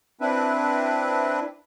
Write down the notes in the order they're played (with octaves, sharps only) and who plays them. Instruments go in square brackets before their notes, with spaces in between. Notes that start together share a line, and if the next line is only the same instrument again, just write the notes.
[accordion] C4 D4 E4 B4